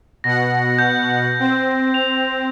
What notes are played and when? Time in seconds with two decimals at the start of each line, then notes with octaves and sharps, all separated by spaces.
0.24 B2 F#5 A#6
0.79 G6
1.40 C4
1.94 F7